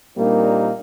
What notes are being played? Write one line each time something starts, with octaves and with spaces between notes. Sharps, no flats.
A#2 G3 A#3 C4 D4 D#4